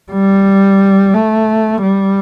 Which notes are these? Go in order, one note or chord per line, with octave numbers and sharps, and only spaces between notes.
G3
A3
G3